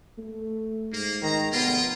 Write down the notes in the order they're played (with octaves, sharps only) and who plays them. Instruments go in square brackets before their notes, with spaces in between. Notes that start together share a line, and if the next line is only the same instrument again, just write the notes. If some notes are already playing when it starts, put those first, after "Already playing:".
[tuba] A3
[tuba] G#2 [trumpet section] A#3
[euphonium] D#3 [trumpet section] A#5
[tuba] F1 [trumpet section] A#3 F4 [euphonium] B3